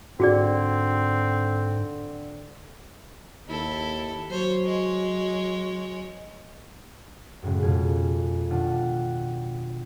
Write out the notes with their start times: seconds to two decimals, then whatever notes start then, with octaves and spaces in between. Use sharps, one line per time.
0.20 G#2 D3 C4 F#4 G#4 D5
3.48 D#2 E4 A4
4.30 F#3 C5 C#5
4.65 G#3 C#5
7.42 F#2 A2 C#3 G#3
7.63 F2 B2 G#3 G#5 G#6
8.50 B2 D#3 D4 F4 F#5 A5